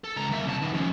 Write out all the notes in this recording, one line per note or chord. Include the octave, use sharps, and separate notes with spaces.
A4
C#2 A#5
A#3 E5
C2 A5
D#3 B3
F3 C#4